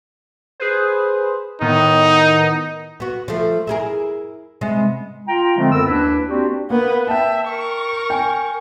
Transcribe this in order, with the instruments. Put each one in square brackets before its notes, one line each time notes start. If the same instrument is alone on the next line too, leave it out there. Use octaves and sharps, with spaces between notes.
[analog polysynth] G#4 B4 C5
[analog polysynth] A2 D#3 B3 [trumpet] D#4
[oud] B3 F#4
F3 A3
E4 G#4 A#4
C3 G#3 B3
[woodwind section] F4 G5 A#5
D3 F3 G#3 A3 C4
F#2 B3 A4 A#4 E6
D#2 D4 E4 B4
A#3 C4 D4 F#4 G4 D5
[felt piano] A#3 [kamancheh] B3 B4
[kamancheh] E5 [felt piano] G5 A5
[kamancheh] A#4 C#6
[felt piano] G5 G#5